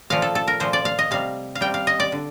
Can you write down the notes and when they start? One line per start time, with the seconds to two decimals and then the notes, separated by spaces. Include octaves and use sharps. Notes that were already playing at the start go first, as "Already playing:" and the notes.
0.10 A#2 F3 A3 F5
0.22 A4
0.35 A4
0.48 A#4
0.60 A#2 F3 A3 C5
0.73 D5
0.85 F5
0.99 D#5
1.11 C3 G3 F5
1.55 F5
1.61 C3 G3 G5
1.74 F5
1.87 D#5
2.00 D5
2.12 D3